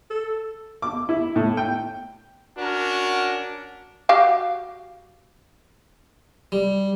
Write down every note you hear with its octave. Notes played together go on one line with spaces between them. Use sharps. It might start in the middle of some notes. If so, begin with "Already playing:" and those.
A4
D6
E4
A2
G5
C#4 D4 F#4 A#4
F#4 G4 F5
G3